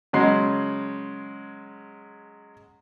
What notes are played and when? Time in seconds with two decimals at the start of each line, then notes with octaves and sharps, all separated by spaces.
0.13 C#3 F#3 G#3 C6 C7